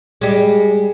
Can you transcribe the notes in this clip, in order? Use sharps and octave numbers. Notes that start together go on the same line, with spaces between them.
G3 G#3